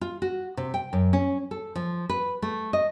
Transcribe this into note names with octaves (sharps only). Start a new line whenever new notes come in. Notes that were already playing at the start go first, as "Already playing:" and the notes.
F4
F#4
C3
G5
F#2
C#4
A4
F3
B4
A3
D#5